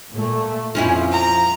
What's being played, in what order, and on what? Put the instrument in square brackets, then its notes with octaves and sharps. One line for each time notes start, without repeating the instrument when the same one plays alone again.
[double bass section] A#2 A3
[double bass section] F2 [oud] F3 C#4 E4
[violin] A#5